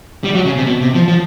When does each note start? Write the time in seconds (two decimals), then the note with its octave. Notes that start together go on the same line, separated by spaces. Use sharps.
0.24 G3
0.35 F#3
0.45 C#3
0.57 C3
0.66 B2
0.81 C3
0.94 F3
1.08 F3